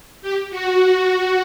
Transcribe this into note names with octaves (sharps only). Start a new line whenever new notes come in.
G4
F#4